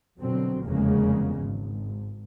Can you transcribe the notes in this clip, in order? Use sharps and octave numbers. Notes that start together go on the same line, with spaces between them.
F2 B2 D3 F#3 C4
F1 E2 C#3 G#3 A#3
G#1